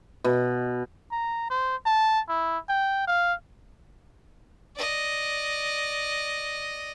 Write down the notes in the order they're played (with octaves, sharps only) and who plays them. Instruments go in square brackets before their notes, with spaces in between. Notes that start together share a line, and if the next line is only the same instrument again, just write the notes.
[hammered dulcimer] B2
[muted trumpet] A#5
C5
A5
E4
G5
F5
[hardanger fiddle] D5 D#5